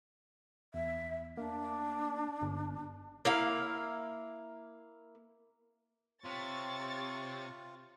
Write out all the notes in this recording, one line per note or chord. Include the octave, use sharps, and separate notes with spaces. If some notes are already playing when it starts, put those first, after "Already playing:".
E2 E5
A#3 D4
G1
A#3 E4 F5
C3 C4 F4 C#5 C#6 A6